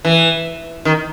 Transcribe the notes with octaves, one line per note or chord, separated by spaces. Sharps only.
E3
D#3